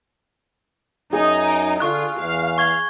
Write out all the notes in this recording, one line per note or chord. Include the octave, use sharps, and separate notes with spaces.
F#2 D#4 G#4
D7
D3 F4 C#6 F#6
E2 F5
C#6 G#6 G7